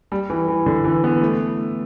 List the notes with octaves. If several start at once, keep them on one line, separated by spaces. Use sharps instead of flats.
G3
E3
E3
D3
E3
B3
A3